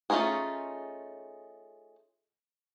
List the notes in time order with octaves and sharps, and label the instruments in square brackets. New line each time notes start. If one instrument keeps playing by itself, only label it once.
[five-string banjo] A3 C#4 D#4 F4 G#4